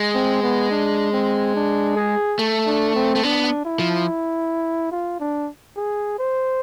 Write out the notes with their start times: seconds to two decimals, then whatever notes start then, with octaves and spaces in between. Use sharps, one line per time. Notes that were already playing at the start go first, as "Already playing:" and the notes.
Already playing: G#3
0.15 C4
0.43 B3
0.71 D4
1.12 C4
1.55 D4
1.96 G#4
2.39 A3
2.67 D4
2.95 C4
3.15 A3
3.23 B3 D4
3.65 E4
3.80 F3
4.92 F4
5.20 D4
5.77 G#4
6.19 C5